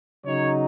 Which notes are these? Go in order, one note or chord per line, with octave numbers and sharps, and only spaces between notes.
C#3 F#3 D#4 C#5